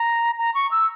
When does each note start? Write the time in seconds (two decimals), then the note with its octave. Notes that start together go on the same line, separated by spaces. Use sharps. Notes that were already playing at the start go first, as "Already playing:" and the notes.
Already playing: A#5
0.38 A#5
0.55 C#6
0.71 E6